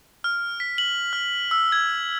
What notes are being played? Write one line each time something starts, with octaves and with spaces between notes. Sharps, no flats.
F6
B6
F#7
F6
E6
G#6